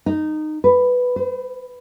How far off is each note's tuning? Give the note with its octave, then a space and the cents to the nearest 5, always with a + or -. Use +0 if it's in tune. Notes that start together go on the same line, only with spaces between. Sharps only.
D#4 -15
B4 +5
C5 -40